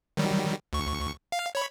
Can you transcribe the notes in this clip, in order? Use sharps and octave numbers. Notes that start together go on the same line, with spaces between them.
D#3 F#3 G3
D2 C#6
F5
C#5 B5